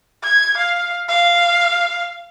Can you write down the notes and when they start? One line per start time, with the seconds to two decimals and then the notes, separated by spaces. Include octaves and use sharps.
0.23 G#6
0.57 F5
1.09 F5